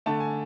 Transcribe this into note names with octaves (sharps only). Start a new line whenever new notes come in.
D3 A3 A5
G#5